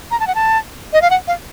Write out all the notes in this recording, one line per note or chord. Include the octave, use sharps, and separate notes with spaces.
A#5
A5
F#5
A5
D#5
F5
F#5
F5